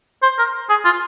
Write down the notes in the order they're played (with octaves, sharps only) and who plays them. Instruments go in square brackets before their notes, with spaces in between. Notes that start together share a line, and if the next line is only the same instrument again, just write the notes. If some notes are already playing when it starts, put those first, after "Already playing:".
[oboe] C5
A#4
G#4
F4